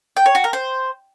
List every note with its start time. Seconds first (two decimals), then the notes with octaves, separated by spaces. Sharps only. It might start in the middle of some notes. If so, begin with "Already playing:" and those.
0.17 G5
0.26 C#5
0.35 F#4
0.44 A#4
0.53 C5